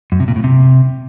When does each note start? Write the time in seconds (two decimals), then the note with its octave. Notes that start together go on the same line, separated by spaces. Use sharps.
0.12 F#2
0.20 C3
0.28 A#2
0.36 A2
0.44 C3